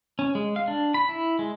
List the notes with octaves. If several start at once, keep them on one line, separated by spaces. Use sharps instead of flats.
C#4
G#3
F5
D4
B5
E4
G#3